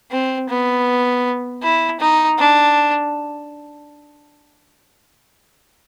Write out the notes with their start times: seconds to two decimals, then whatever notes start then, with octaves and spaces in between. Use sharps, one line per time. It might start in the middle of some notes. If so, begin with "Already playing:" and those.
0.11 C4
0.49 B3
1.63 E4
2.00 D#4
2.39 D4